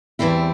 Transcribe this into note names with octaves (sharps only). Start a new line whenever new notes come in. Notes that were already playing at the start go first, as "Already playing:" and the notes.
E2 E3 G3 C4 E4